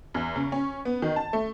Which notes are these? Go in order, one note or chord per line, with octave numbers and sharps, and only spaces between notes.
E2
C#3
C#4
B3
D#3
A5
A3